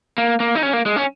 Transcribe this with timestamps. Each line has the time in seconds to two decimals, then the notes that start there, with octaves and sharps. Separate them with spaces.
0.18 A#3
0.40 A#3
0.55 D#4
0.63 C#4
0.73 A#3
0.86 G#3
0.96 C#4